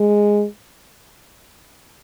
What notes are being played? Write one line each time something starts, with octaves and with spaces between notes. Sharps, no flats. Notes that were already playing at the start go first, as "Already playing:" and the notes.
Already playing: G#3